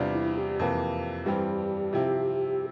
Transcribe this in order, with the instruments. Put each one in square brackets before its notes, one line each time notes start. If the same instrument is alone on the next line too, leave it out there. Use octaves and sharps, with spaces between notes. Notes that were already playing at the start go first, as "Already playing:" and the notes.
Already playing: [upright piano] E2 C3 G3 D4 F4
[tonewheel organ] E4
G4
[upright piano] F2 C3 E3 A#3
[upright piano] G2 E3 G3 C4 [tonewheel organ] G4
[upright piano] C3 F3 C4 E4